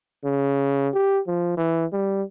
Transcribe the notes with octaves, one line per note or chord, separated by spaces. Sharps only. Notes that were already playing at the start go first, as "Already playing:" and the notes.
C#3
G4
F3
E3
G3